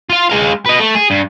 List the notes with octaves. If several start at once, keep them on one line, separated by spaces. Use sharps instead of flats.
F4 F5
G#3 F5
B4 D#5
A3
G#4
G2